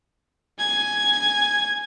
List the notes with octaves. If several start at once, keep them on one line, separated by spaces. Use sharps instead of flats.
G#5 G#6